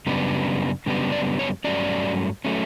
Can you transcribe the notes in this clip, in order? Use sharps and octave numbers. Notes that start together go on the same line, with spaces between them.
F#2 C#3 G3 B3 D4
F#2 C#3 G3 B3 D4
D5
C#5
G2 F#3 A3 C#4 D5
F#3 A3 C#4